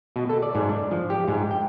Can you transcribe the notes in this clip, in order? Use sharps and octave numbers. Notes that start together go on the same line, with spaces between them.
B2
A4
D5
G#2
D4
F3
G4
G#2
G5